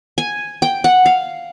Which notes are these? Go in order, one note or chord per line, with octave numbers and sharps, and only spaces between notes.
G#5
G5
F#5
F5